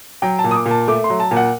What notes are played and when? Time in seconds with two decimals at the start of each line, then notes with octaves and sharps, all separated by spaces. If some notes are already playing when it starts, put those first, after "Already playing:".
0.22 F#3 G5
0.39 A5
0.44 A#2
0.51 D#6
0.55 D6
0.66 A#2
0.71 A5
0.88 A3 D6
1.04 C6
1.10 F#3
1.20 A5
1.31 A#2
1.37 F#5